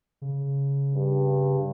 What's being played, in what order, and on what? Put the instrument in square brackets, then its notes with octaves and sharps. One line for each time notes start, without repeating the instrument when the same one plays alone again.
[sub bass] C#3
[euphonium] G2